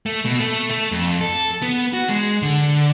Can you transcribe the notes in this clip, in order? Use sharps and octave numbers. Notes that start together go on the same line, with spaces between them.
A3
B2
A3
A3
F2
A4
B3
F#4
G#3
D3